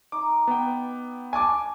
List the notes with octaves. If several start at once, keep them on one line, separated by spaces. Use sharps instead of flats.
D#4 D6
B3 G5
G#5 A5 D6